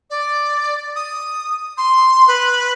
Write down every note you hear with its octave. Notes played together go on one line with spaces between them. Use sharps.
D5
D#6
C6
B4